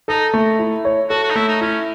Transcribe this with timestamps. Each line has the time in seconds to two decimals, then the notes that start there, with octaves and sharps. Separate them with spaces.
0.08 D#4 A4
0.34 A3
0.59 E4
0.85 C#5
1.10 F#4 A4
1.23 F#4
1.30 D#4
1.35 A3 E4
1.48 D#4
1.61 C#4 E4